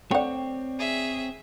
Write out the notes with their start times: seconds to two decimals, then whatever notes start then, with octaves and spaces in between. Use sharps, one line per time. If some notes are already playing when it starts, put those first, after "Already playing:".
0.11 A3 C4 C#5 D5 F#5 G5
0.79 G#4 E5